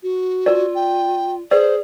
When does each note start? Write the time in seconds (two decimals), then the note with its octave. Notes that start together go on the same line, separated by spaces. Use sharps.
0.03 F#4
0.46 F4 A#4 D5
0.75 G5
1.51 G#4 B4 C5 D5